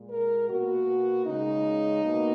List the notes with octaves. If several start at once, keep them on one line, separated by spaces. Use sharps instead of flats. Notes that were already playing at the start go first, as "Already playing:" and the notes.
Already playing: A#2 G#3
A#4
B2 A#3 F#4
C#3 G#3 D#4
B2 A#3